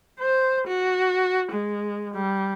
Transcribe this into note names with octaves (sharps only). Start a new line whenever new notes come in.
C5
F#4
G#3
G3